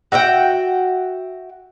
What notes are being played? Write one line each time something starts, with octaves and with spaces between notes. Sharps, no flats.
F#4 E5 F#5 G5